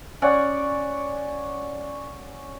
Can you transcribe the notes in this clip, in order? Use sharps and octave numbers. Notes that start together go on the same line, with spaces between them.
C#4 D5 F#5